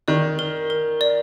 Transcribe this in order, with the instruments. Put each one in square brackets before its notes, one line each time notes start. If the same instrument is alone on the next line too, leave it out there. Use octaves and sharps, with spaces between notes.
[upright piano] D#3 [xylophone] D5
[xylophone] A#4
A#4
D5